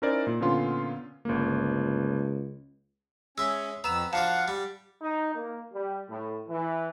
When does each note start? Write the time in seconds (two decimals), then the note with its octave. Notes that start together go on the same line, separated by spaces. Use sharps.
0.02 C#4 D#4 E4 A#4 C5 D5
0.27 A#2
0.41 A#2 D3 B3 C#4 F4 C6
1.25 G1 C#2 A#3
3.38 G#3 C#4 E5 E6
3.84 F2 B3 A#5 E6 E7
4.13 F3 D4 F#4 F5 F#5 A5
4.48 G3
5.01 D#4
5.35 A#3
5.73 G3
6.09 A2
6.49 E3